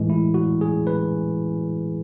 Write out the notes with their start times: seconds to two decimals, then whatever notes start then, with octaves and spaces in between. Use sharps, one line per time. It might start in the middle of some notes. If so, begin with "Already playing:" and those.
Already playing: A2 E3 G#3
0.10 E4
0.34 F#4
0.61 G#4
0.87 B4